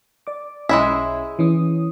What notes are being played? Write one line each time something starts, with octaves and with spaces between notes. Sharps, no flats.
D5 D6
B1 G#3 C#4 E4 E5 G#6
E3 C#4 D#6